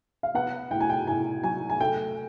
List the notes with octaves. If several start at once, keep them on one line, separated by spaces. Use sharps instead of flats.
F5
B3 F#5
A2 G5
G#5
G5
A2 G#5
F#3 G#5
G#5
A3 G5